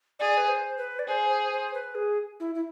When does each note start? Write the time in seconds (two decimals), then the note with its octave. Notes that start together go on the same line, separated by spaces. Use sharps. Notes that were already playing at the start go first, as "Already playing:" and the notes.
0.19 G#4 D5
0.38 B4
0.48 C5
0.78 B4
0.99 D5
1.08 G#4 C5
1.29 C5
1.52 C5
1.74 B4
1.95 G#4
2.40 E4
2.55 E4